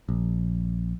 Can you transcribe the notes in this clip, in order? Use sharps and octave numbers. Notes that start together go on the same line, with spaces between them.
A#1